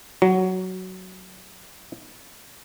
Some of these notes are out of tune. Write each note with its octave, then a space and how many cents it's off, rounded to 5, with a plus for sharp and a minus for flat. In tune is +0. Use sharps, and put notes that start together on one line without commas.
F#3 +10